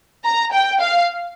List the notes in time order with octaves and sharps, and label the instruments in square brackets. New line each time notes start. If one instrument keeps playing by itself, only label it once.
[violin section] A#5
G5
F5